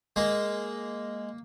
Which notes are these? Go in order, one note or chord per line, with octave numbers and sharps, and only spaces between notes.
G#3 A#3